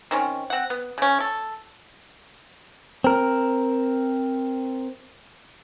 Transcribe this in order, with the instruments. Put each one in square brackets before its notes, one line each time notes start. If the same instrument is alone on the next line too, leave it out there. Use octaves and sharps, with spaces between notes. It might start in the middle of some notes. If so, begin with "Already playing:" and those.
[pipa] D#3 C4 C#4
C4 F#5
B3
C#3 C#4
A4
[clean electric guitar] C4 A#4